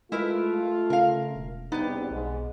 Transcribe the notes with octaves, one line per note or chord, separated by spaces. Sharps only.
G#3 A3 E4 F4 A#4 B4
C#3 A#4 F5
E1
E2 G2 C3 B3 D#4 G4
B1 G#2